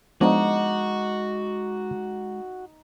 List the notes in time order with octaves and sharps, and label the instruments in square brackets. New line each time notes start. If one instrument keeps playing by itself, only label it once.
[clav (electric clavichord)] F3 B3 D4 [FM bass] G#3 [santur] D#4 D6 [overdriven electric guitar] F#4